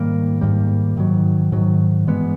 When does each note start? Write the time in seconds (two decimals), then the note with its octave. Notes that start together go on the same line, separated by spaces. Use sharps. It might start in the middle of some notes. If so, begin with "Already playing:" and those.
Already playing: G#2 D#3 G3 A#3
0.41 G#2 D#3 G3 A#3
0.97 G#2 D#3 F#3
1.52 G#2 D#3 F#3
2.07 G2 E3 G#3 B3